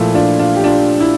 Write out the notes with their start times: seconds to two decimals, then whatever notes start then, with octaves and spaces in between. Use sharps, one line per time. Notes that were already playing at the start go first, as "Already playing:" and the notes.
Already playing: A#2 F3 A3 E4
0.15 D4 F4
0.39 D4 F4
0.56 G4
0.64 D4 F4
1.00 E4